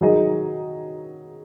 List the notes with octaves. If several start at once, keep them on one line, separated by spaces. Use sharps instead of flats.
D#3 F#3 D#4 G#4 D#5